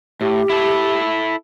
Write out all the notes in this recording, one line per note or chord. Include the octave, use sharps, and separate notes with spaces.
A2 G4
E4 A4